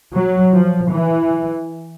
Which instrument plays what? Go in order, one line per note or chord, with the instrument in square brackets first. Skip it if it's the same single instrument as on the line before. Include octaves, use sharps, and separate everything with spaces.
[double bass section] F#3
F3
E3